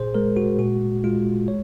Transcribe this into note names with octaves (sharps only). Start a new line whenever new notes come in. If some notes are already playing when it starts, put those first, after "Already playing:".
Already playing: A#2 G#4 C5
G#3 A#4
F#4
A#2 F#4
G#3 F4
C#5